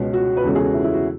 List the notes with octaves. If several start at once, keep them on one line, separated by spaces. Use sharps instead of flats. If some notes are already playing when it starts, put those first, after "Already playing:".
Already playing: C#2 B2 G#3 C#4
F#4
B4
E2 C#3 G#3 C#4 A4
G#4
F#4
E4
E4
F#4